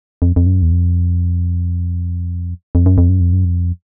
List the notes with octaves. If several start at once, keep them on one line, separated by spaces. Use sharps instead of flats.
F2
F2
F#2
E2
F2
F2
F#2
F2
F#2
F2
F#2
F2